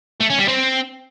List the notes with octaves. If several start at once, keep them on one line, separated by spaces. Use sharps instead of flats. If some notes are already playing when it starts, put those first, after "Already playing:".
A3
C#4
G3
C4